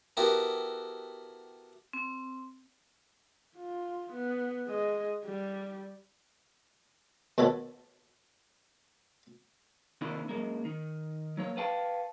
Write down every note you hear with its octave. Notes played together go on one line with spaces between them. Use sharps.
B3 E4 F#4 G4 A4 A#4
C4
F4
B3
G#3 D#5
G3
D#2 B2 F#4 A4 C#5 B5
C3 D#3 A#3 D4 E4
F#2 F3 G#3 A#3
D#3
F#3 A#3 C#5
B4 F5 G5 A5